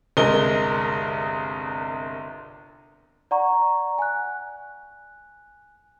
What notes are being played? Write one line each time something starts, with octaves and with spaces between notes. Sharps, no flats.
G1 C2 G#3 A#4 D#5 G7
D5 F#5 A#5 C#6
G#5 F#6